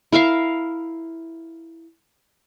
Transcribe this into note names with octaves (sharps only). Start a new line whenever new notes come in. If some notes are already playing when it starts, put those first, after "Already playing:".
E4 A#4 E5 F5